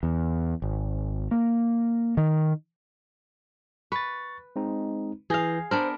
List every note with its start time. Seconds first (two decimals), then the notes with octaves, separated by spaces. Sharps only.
0.03 E2
0.62 G#1
1.31 A#3
2.17 D#3
3.92 B4 C#6 A6
4.56 G#3 C4 D#4
5.30 E3 G#4 F5 G6 A#6
5.71 B3 D4 A#4 C5